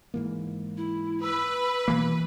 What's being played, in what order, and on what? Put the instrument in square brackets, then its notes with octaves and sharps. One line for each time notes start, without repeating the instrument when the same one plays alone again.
[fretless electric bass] G#2 E3 A#3
[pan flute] E4
[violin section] B4 [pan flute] E6
[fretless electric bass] B2 [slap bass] E3 A#3